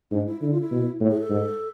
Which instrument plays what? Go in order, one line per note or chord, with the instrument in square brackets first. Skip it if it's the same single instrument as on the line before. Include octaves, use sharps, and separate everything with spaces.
[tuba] G#2 [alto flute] D4
[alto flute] E4
[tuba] D3 [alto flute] E4
[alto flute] F4
E4
[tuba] B2
A2
[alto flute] G#4
A4
[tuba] G#2